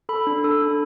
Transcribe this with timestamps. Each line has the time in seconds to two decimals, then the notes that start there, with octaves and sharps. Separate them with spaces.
0.09 A4 B5
0.27 D4
0.44 A4
0.62 D4